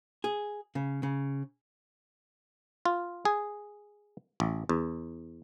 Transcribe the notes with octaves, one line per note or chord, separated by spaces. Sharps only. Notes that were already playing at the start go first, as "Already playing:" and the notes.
G#4
C#3
C#3
F4
G#4
A1
E2